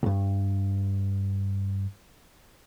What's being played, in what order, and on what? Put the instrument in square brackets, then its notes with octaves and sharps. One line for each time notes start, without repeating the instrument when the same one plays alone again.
[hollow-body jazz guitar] C#2 G2